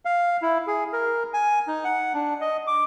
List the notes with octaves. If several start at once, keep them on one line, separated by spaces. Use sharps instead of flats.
F5
E4
G#4
A#4
G#5
D#4
F#5
D4
D#5
D6